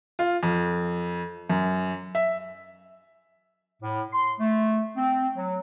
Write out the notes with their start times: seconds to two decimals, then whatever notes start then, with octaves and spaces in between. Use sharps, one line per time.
0.19 F4
0.43 F2
1.50 F#2
2.15 E5
3.82 A2
4.13 C6
4.40 A3
4.97 C4
5.37 F#3